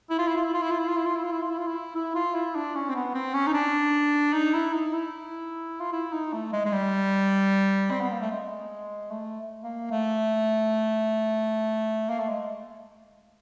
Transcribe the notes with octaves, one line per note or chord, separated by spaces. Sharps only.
E4
F4
E4
F4
E4
F4
E4
F4
E4
F4
E4
F4
E4
F4
E4
F4
E4
F4
E4
E4
F4
E4
D4
C#4
C4
B3
C4
C#4
D#4
D4
D#4
E4
D#4
E4
F4
E4
D#4
A3
G#3
G#3
G3
C4
B3
A#3
A3
G#3
A3
A#3
A3
A#3
A3
G#3